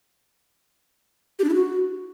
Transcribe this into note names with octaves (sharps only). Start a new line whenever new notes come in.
G4
D4
E4
F#4